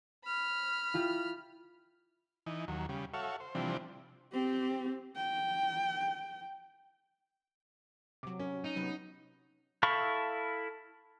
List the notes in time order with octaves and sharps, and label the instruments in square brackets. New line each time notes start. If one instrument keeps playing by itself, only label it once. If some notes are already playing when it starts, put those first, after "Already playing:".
[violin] B5 F6
[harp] E4 F4 G4
[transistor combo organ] E3 D#4
D#2 F#3
C#3 G3
F#4 A4 C#5 E5 F5
C5
C3 E3 F3 G3 C4 D4
[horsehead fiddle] C4 G4
G5
[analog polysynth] C3 F#3 [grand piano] D6
[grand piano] C#4
[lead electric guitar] D#4
[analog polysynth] C3 F#3 B3
[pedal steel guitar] E4 A4 F5 B5 C#6